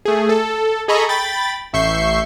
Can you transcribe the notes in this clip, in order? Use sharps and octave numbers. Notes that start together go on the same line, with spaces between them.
A3 G#4
A4
G#4 A4 D#5 A#5 B5 C#6
G5 B5 A6
A1 E5 C#6 G6 C7